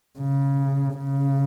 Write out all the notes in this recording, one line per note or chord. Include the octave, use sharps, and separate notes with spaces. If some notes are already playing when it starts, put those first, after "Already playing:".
C#3
C#3